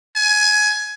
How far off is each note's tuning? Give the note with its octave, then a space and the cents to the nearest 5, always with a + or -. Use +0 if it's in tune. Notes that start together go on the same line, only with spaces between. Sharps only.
G#5 +20